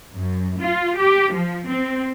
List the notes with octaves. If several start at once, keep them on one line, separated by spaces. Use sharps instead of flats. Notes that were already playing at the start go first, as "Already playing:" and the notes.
F#2
F4
G4
F3
C4